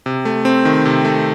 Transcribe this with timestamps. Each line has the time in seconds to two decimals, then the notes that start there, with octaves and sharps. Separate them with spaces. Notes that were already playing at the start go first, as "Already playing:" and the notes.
0.06 C3
0.25 A3
0.45 C4
0.65 D#3
0.85 C3
1.05 A3